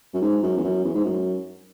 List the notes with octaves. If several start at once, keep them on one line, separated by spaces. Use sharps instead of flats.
F#2
G#2
F#2
E2
F#2
E2
G#2
F#2